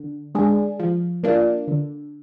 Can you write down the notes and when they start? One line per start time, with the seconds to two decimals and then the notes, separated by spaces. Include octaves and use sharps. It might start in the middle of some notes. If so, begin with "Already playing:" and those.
Already playing: D3
0.35 G#3 D4 G#4
0.79 F3
1.23 A#3 D4 F4
1.68 D3